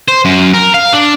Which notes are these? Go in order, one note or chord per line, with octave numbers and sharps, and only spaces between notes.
C5
F#2
A#4
F5
D4